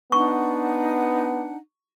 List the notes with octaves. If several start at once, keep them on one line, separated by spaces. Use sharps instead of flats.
B3 D4 D#4 F#5 C#6